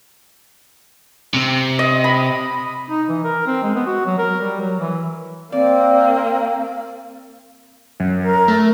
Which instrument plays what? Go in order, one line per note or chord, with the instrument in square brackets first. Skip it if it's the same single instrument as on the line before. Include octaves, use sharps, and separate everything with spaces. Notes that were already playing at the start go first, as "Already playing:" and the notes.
[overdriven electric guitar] C3
[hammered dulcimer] D#5
B5
[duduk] D#4
E3
A#4
C4
G#3
B3
F#4
F#3
A#4
G3
F#3
E3
[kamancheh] A#3 [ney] C4 [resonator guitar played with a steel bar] D5
[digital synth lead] F#2
[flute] A#4
[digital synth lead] A3